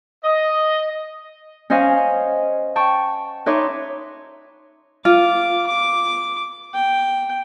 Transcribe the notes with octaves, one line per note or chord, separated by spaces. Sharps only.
D#5
C#4 C5 D#5 F5 F#5 G#5
G5 A5 C#6
D#4 B4 C#5 E5 C6 D6
F4 D6
D6
G5